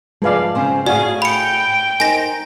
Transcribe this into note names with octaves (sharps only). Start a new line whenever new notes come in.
F3 G#3 G#4 B4 D5 F5
C#3 C4 C5
A2 F#4 G#4 D5 F5 G#5
G5 B5 C#7
D#4 A#4 C5 G#5 A#6